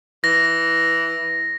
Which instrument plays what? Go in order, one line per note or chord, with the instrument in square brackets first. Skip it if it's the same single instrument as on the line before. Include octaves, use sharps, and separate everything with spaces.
[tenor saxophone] E3 [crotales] A#6